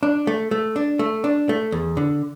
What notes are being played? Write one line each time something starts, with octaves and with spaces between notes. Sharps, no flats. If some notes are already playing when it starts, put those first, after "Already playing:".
D4
A3
A3
D4
A3
D4
A3
E2
D3